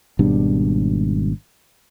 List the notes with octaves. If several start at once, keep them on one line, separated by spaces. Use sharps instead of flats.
G#1 B2 G3 D4